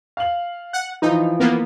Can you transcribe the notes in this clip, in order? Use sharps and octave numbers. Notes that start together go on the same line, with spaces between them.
F5 F#7
F#5
E3 F3 D#4
A#3 B3